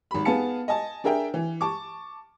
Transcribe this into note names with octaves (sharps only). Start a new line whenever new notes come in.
G#1 B5
B3 G#4 F5 A5 C#7
D#5 G#5 A5
D4 G#4 A#4 E5 G5
E3
A5 C#6 D6